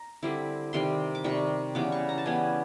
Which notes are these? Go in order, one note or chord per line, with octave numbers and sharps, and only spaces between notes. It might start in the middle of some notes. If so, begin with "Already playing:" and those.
Already playing: A#5
D3 G3 C4 E4
C3 D#3 G3 C6
D6
C3 D#3 G3 C#6
C#3 E3 G3 B3 D6
C#6
A#5
A5
C#3 E3 G3 B3 G#5